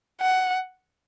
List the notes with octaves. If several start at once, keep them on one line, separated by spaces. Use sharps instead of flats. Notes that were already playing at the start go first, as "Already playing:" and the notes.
F#5